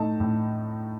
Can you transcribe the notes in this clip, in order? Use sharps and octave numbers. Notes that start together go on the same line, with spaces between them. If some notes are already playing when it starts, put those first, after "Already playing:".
Already playing: A2 A3 D#4 A5
A2